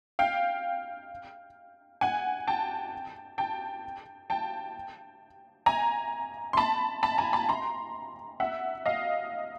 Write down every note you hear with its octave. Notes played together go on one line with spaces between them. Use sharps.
F5 G5
F#5 G#5
G5 A5
G5 A5
G5 A5
G#5 A#5
C6
A5 B5
A5 B5
G#5 A#5
A5 B5
A#5 C6
E5 F#5
D#5 F5